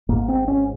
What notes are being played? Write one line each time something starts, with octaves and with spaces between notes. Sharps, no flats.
G#1 G#2 A#3
C4
C#4